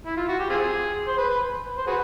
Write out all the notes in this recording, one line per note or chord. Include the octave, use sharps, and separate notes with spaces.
E4
F4
F#4
G4
C4 F4 G#4
C5
B4
B4
C5
F#4 G#4 B4